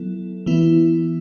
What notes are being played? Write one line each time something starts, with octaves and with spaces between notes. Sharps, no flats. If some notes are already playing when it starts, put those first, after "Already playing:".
Already playing: F#3 B3 E4 A4
E3 B3 E4